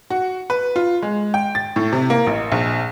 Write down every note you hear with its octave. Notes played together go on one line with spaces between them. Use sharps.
F#4
B4
F4
G#3
G5
A6
A2
C3
A#3
A1
A#1